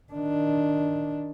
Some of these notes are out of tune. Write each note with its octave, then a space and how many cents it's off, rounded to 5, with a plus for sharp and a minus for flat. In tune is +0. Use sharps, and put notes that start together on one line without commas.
D#3 +0 D4 -5